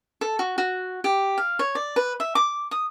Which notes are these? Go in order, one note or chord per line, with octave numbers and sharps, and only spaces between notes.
A4
F#4
F#4
G4
F5
C#5
D5
B4
E5
D6
D#6